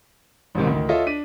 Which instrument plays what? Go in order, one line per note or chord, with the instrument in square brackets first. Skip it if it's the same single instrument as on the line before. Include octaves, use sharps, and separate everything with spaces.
[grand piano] A1 G#2 C3 D#3
D2 D#3
F4 A4 C#5 D#5 E5
D4 B6 D#7